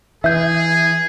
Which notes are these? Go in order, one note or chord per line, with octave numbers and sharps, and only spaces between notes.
E3 G#4 E5 G6